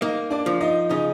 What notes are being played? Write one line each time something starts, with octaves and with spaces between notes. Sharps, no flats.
A#3 D#4 D#5
D4 D5
F3
D#4 D#5
C#3 D#4 D#5